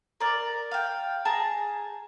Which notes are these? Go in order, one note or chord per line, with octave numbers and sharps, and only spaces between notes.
A#4 D5
F5 G5
G#4 A5 A#5